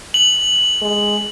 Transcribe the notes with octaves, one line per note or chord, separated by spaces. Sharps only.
F#7
G#3